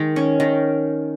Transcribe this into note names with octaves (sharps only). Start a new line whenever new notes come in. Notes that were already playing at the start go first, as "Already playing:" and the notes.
Already playing: D#3 G#3
C#4
D#3